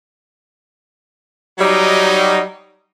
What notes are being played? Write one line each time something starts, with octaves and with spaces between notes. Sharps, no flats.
F#3 G3 D#4